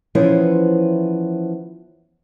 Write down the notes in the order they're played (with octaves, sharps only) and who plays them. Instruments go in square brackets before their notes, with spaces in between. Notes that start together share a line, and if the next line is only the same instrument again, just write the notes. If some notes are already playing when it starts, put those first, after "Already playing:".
[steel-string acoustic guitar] E3 F3 B3 C#4 E4 C5